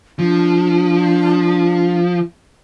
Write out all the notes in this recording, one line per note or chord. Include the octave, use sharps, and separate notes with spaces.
F3 D4